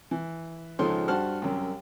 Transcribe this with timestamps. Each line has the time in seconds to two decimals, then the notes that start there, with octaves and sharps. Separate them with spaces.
0.11 E3
0.79 C#2 G#2 F3 G#3 A4 C6
1.08 G2 F#4 C5 F#5 A5 F6
1.42 C2 F#2